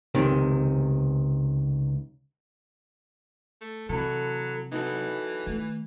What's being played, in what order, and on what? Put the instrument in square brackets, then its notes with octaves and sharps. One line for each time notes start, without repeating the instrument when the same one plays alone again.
[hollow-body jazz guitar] C#2 C3 D#3
[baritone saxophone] A3
[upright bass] C3 [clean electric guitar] E3 A4 [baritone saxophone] F#3
[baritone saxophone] E3 [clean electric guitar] D#4 F#4 A4
[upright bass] D#3 A3